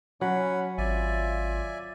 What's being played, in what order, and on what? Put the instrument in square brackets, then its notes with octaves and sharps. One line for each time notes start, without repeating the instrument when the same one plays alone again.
[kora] F#3 [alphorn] C#4 [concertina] F#5 B5
[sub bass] G#1 [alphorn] F4 [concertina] D5 E5 G#5